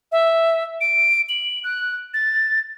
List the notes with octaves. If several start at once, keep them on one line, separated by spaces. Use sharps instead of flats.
E5
D7
F#7
F#6
A6